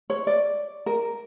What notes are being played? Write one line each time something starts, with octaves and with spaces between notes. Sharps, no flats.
C#5
D5
A#4